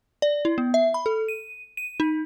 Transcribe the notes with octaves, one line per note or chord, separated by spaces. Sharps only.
D5
E4
B3
E5
B5
A4
D#7
D#7
D#4